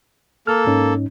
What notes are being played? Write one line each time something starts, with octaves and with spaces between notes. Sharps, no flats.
A#3 A4 F6
G#2 C#4 D#4